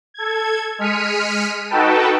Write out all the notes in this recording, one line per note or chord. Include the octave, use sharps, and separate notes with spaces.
A4 G#6
G#3 F6 B6 C#7 D#7
D#4 F#4 A4 B4 G5 A5